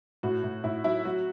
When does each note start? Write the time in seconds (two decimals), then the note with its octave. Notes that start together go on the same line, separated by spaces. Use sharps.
0.23 A2 F#4
0.44 A2
0.64 A2 E4
0.84 F#3 E4
1.05 F#3 F#4